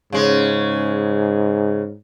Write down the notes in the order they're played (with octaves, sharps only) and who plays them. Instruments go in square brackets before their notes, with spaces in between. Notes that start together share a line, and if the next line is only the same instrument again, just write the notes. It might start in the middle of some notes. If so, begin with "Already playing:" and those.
[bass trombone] G#2 [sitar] C#3 G#3